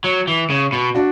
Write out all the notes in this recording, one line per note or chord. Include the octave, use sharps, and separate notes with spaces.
F#3
E3
C#3
B2
D4 F#4